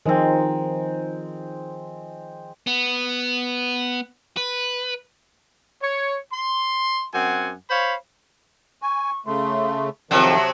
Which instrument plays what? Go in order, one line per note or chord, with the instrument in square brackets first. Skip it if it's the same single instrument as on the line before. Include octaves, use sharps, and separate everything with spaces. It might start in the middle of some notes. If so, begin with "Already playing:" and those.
[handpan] D#3 F3 D#4 [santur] G#3 C4
[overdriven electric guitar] B3
B4
[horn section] C#5
C6
F#2 C4 F#5 G#5
C5 C#5 F5 B5
[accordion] G#5 [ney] C#6
[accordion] C#3 A3 [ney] C6
[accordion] F2 D#3 F3 [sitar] C3 F#3 [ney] A5